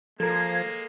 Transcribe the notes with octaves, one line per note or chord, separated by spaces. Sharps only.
F3 G#3 A#3 A4 A#4 G#6